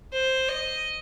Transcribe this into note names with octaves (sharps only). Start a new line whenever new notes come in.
C5
D#5